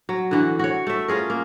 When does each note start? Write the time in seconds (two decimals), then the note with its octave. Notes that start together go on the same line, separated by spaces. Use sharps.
0.09 F#3
0.31 D3 E3 F#4
0.59 F#4 C#5
0.87 A3 E5
1.08 C#4 F4 G#4 A#4
1.30 A#3